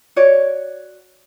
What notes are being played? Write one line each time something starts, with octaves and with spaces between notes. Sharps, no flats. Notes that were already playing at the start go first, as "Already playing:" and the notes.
F#4 C#5 D5